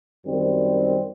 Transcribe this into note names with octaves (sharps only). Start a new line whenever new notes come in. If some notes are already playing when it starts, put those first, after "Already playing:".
F#2 D#3 G3 C4